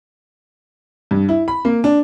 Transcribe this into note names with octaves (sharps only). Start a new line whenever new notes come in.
G2
E4
B5
A#3
D4